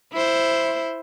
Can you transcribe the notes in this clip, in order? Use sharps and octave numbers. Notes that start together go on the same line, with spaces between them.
E4 C5